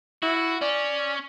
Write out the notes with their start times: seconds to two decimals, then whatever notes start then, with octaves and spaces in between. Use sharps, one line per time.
0.22 E4 F#4
0.62 C#4 D5